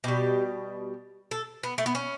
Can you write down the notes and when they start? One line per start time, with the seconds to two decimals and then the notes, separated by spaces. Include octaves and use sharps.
0.04 B2 G3 G4
1.31 A4
1.63 B3
1.78 A3
1.86 B3
1.95 C#4